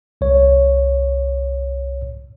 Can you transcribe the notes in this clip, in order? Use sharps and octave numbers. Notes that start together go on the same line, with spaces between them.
C2 C#5